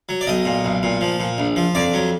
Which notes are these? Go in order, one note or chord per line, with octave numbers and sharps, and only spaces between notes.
F#3
D5
B1 D#5
A#2
B1
A#2
F3
A#2
A#1
F3
F2 D5
F#3